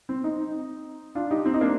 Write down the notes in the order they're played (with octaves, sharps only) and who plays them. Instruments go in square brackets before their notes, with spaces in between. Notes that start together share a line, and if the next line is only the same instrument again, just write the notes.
[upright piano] C4
C4 D#4
D4 F4
D#4 G4
C4
D#4
A#3 D4